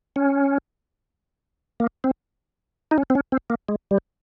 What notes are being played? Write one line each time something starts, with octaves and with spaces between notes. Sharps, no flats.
C#4
A#3
C4
D#4
C#4
C4
C#4
C4
A#3
G#3
G3